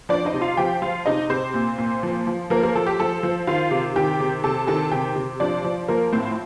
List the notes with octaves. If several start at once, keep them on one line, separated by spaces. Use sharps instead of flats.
F3 D4 D5
D#4 D#5
C3
F4 F5
F3 G4 G5
F3 F4 F5
C3 D#4 D#5
C3 C4 C5
A#2
A#2
F3
F3
F3 A#3 A#4
A#3 A#4
F3 A4
G4
F3 A4
F3
D#3 F4 F5
C3
D#3 G4 G5
C3
C3 A4 A5
D#3 A4 A5
C3 G4 G5
C3
F3 D4 D5
F3
F3 A#3 A#4
A2 C4 C5